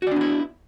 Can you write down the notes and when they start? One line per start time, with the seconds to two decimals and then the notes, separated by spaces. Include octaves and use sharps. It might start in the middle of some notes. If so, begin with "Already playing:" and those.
0.02 F#4
0.07 D5
0.11 D4
0.16 B3
0.21 E4